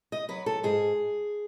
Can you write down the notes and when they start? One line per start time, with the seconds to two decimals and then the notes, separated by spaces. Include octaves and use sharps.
0.12 D#5
0.29 F#3 B4
0.46 A4
0.63 G#2 G#4